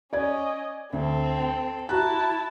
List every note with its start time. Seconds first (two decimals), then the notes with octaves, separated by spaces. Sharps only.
0.13 C#4 D5 D#5 G#6
0.93 D2 C4 A4
1.37 G5
1.89 E4 F#4 A5 A#5 F#6